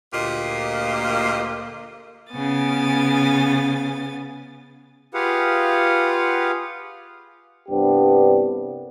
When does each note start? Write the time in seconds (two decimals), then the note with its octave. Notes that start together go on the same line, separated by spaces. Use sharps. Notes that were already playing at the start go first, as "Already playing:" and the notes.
0.13 D2 A#2 A#3 F4 G4 D#5
2.33 C#3 B3 G#5 A6
5.14 F4 G4 G#4 B4 F5 F#5
7.69 C2 G2 C3 B3 D4 G4